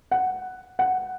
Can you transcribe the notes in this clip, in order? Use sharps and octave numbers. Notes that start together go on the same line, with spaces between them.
F#5
F#5